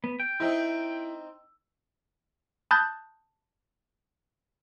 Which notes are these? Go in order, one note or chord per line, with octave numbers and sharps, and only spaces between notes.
B3
G5
C4 D#4 E4
A5 B5 D#6 F#6 G6 A6